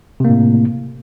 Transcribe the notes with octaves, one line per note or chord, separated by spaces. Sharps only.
A2 C3 A#3